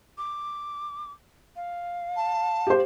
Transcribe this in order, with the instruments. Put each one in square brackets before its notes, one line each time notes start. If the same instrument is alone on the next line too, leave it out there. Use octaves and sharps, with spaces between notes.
[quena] D6
F5
[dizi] A5
[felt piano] G4 C5